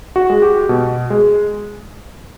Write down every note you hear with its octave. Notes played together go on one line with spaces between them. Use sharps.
F#4
G#3
G4
B2
G#3